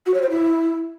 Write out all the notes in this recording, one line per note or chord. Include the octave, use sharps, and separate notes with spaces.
F#4
C#5
C5
E4